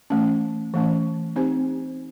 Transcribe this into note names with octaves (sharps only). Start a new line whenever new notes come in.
E3 A3 C#4
E3 A3 C#4
C4 D#4 G4 C5